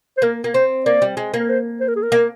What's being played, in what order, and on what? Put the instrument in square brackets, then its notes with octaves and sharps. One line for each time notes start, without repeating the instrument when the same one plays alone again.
[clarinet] C5
[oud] A#3 [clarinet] A#4
[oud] A#3
[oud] C4 [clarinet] C5
[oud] A#3 [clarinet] D5
[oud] G3
G#3
A#3
[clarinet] A#4
C5
C5
A#4
G#4
A#4
[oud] A#3